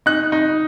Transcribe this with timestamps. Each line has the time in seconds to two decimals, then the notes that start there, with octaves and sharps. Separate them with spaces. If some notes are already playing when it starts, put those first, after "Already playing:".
0.06 D#4 F#6
0.32 D#4